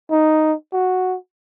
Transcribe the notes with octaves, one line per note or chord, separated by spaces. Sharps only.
D#4
F#4